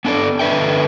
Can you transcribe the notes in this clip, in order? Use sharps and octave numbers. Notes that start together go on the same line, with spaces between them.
B3 D4 A4 D5
D3 B4 E5 G5